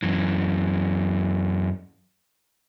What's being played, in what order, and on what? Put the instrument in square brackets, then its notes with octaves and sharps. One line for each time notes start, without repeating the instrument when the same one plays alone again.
[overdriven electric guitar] F#2 E3